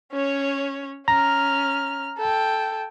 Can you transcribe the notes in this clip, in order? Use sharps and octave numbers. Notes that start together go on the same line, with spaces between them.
C#4 C#5
C#4 A#5 F6
A4 G5